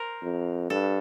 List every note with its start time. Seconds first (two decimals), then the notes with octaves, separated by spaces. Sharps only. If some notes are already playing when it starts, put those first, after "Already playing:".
Already playing: A#4 C5
0.22 F2
0.70 G2 A4